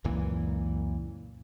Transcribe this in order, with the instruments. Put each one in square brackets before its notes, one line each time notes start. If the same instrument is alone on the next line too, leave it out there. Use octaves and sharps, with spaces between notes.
[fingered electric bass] C#2 F#2 A#2 E3